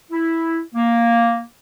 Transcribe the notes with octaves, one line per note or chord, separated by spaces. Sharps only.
E4
A#3